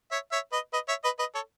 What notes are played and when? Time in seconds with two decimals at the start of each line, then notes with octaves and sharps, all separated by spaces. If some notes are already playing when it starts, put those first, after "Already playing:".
0.11 C#5 E5
0.32 C#5 E5
0.52 B4 D#5
0.73 B4 D#5
0.88 C#5 E5
1.04 B4 D#5
1.19 B4 D#5
1.35 A4 C#5